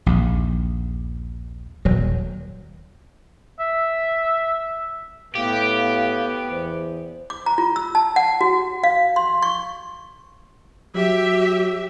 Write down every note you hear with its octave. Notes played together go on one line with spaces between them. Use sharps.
A#1 D#2
D#1 F#3
E5
A2 B3 G4 F5
E2 C5
D6
A#5
F4
E6
A5
F#5
F#4
F5
C6
C#6
F#3 G4 E5